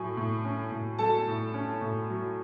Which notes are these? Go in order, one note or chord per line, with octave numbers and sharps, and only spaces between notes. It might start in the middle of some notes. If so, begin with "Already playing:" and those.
Already playing: A2 F#3 G#5
A2
C#4
A2
F#3 A4 A5
A2
C#4
A2
F#3